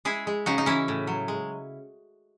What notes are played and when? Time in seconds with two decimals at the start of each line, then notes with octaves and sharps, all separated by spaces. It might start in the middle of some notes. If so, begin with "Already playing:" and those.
0.05 G#3 E4 G#4
0.27 G#3
0.46 C#3 D#4 F#4
0.58 D#4
0.66 E3 C#4 E4
0.88 A2
1.07 F#3
1.28 G#3